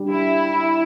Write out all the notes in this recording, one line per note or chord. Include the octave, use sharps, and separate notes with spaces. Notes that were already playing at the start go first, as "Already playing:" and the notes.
Already playing: G3 D4 G4
E4